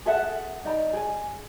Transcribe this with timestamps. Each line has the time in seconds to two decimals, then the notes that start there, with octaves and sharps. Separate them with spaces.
0.05 G#4 A4 E5 F#5
0.65 D#4 D5 A#5
0.93 G#4 G#5